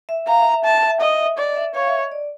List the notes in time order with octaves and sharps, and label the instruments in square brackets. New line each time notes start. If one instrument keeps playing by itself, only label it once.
[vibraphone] E5
[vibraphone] F5 [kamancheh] A#5
[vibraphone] E5
E5
[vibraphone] E5 [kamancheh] A5
[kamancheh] D#5
[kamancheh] D5 [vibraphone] D#5
[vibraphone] E5
[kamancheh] C#5 [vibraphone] F5
[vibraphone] E5
D#5
D5